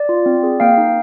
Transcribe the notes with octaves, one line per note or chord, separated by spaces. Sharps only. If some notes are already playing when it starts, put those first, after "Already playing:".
Already playing: D5
F4
C4
G#4
A#3 F5 G5
D#4